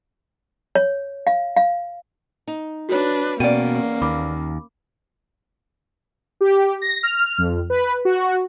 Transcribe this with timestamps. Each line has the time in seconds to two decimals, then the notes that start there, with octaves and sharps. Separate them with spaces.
0.75 C#5
1.27 F5
1.56 F5
2.47 D#4
2.89 D4 F#4 B4 C#5
3.40 E2 B2 A#3 C#4 D5 F#5 G5 D#7
4.02 D#2 B5 D6
6.41 G4
6.82 A#6
7.03 F6
7.38 F2
7.70 B4
8.05 F#4